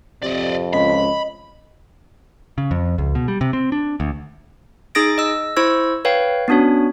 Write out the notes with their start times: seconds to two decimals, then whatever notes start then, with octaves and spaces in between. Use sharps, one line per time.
0.23 F2 C3 D5 D#5
0.73 C#2 D#5 B5
2.58 C#3
2.71 F2
2.98 C#2
3.15 B2
3.28 G3
3.41 C3
3.53 C4
3.72 D4
4.00 D2
4.95 D#4 G#4 D#6 A6 A#6 D7
5.18 D#5 E6
5.56 E4 C5 C#6 E6 G#6
6.05 B4 C#5 F5 G5
6.48 B3 C#4 D4 F#4 C#5